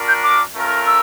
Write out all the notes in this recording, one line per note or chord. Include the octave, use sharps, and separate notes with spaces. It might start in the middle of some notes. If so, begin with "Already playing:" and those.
Already playing: D4 F#4 A#4
G6
D6
A3 C#4 F4 A#4
E6